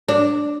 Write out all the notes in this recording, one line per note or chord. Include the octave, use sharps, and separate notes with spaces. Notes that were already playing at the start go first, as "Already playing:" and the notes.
D4